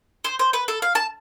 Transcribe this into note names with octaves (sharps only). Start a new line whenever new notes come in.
C5
C5
B4
A4
F5
A5